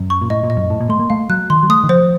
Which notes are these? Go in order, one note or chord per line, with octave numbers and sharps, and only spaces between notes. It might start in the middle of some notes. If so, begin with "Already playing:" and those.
Already playing: F#2
C#6
A#2
A2 D#5
A#2
D#5
F#2
A2 A5
A#2
A3 C6
A#3
A3 F5
F#3 F#6
D#3 C6
F#3
A3 D#6
D#3
F3 C5